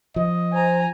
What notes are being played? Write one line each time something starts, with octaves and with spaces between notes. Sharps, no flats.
F3 D#5
C5 G#5 A#5